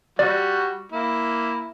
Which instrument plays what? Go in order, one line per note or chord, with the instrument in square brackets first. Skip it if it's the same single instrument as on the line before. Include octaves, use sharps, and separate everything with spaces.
[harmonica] G3 F#4 [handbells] D5
[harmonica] A#3 E4